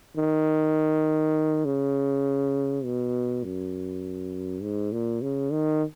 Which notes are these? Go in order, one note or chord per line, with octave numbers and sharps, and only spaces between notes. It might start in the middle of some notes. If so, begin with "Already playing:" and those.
D#3
C#3
B2
F#2
G#2
A#2
C#3
D#3